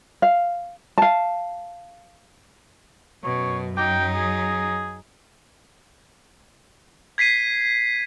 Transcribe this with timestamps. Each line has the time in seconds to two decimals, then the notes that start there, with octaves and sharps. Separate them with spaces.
0.22 F5
0.98 F5 A5
3.24 F#2 B2 C#5
3.78 F#3 D#4 G5
4.14 G#4
7.18 G#6 B6 C7 D#7